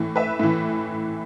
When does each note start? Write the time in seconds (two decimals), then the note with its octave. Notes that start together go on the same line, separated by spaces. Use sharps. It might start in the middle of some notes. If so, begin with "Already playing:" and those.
Already playing: A2 E3
0.16 B4 E5
0.39 A2 E3